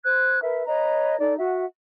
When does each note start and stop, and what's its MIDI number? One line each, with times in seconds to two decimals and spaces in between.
0.04 0.40 72
0.04 0.40 90
0.04 0.40 92
0.42 0.66 70
0.42 0.66 71
0.42 0.66 76
0.66 1.17 71
0.66 1.17 73
0.66 1.17 75
0.66 1.17 82
1.20 1.35 63
1.20 1.35 69
1.20 1.35 74
1.39 1.65 66
1.39 1.65 76
1.39 1.65 78